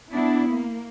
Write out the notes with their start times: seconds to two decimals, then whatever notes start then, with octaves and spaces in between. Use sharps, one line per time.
0.12 B3 D4 E4
0.50 A#3